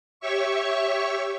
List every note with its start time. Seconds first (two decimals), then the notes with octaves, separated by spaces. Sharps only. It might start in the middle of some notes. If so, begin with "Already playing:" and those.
0.20 G4 C#5 E5 C#6